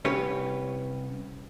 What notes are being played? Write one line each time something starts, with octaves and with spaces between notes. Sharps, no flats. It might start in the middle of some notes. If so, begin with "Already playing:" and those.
C2 C#4 G4 B4 C#5